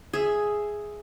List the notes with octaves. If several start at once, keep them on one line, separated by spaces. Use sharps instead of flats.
G#4 E5